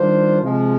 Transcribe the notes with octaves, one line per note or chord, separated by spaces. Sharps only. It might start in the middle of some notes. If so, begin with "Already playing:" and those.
Already playing: D#3 G3 D4 F4 C5
C3 F3 G#3